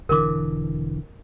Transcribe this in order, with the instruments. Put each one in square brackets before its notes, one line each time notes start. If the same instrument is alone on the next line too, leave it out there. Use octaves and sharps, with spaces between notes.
[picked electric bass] E1 D3 E3 [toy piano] A#4 D6